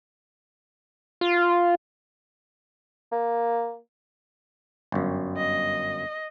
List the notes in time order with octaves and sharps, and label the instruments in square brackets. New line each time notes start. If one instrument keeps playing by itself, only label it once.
[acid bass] F4
[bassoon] A#3
[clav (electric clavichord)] G1 F#2
[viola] D#5